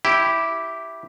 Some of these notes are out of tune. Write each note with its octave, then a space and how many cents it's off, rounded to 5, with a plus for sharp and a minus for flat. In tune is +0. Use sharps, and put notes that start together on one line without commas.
E4 +0 G4 -5